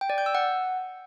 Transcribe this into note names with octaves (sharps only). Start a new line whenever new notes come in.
G5
D5
G6
E6
F#5